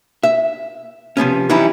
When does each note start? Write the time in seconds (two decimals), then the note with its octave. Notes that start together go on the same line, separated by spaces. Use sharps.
0.23 E5
1.17 C3 F3 B3 C#4
1.50 E3 F#3 G3 C#4 D#4 E4